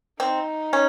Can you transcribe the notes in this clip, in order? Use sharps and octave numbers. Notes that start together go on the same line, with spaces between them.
C4 D#4
C#4